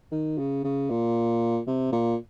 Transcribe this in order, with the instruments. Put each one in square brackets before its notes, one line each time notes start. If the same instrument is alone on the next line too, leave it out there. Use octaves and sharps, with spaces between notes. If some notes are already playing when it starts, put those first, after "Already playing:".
[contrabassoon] D#3
C#3
C#3
A#2
C3
A#2